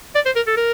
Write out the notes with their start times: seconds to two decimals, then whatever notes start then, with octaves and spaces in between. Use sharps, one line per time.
0.15 D5
0.26 C5
0.36 A#4
0.47 A4
0.57 A#4